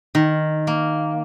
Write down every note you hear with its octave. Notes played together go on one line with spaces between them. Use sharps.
D#3
A#3